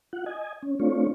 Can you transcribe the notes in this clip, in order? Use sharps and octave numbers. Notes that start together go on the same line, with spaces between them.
F4 F#5
D#5 G#5
C#4
A3 C4 D4 F4 C#5